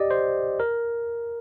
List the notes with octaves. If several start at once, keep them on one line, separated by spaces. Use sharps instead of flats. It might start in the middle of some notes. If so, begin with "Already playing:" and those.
Already playing: G4 D5 D#5
C5
A#4